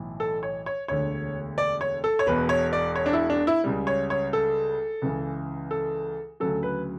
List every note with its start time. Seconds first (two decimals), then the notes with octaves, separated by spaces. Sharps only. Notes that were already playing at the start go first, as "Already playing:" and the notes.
Already playing: B1 A2 E3
0.20 A4
0.43 C#5
0.66 C#5
0.88 E1 D2 D3 C#5
1.58 D5
1.81 C#5
2.04 A4
2.19 C#5
2.26 E1 E2 B2 B4
2.49 C#5
2.73 D5
2.96 C#5
3.06 D4
3.13 E4
3.30 D4
3.47 E4
3.64 C#2 C#3 G3
3.87 C#5
4.10 C#5
4.33 A4
5.02 C#2 C#3 E3
5.71 A4
6.40 D2 C#3 F#3 A4
6.63 B4